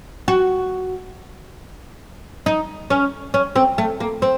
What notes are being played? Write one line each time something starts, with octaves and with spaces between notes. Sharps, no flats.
F#4
D#4
C#4
C#4
C4
A3
A#3
C4